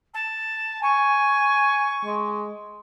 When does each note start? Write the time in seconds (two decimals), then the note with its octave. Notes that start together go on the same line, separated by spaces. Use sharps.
0.14 A5
0.83 G#5 C#6
2.05 G#3